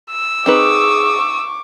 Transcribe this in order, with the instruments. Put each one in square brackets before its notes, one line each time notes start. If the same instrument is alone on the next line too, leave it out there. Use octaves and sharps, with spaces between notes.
[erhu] E6
[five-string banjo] C4 D#4 B4 [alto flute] G#4 [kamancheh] C#6 D6